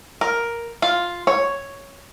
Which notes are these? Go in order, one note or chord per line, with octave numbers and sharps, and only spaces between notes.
A#4
F4
C#5